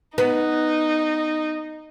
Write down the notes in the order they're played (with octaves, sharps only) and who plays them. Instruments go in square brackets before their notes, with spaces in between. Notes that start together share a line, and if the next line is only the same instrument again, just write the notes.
[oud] B3 [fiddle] D#4